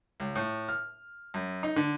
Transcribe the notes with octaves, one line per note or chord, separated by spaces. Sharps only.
C#2
A2
F6
F#2
D#4
D3